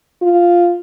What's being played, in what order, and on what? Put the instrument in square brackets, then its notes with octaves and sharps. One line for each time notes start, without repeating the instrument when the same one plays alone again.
[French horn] F4